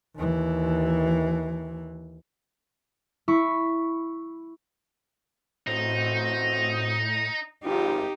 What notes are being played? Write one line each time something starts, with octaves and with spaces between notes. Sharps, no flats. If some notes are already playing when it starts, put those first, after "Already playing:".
D#2 E3
E4 B5 C#6
A1 A2 C4 D#4 F#4
G#1 D#4 F4 G4